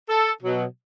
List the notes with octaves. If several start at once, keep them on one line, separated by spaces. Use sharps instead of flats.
A4
B2 F#3